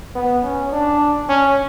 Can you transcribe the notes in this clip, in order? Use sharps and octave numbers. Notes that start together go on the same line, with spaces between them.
B3
C#4
D4
C#4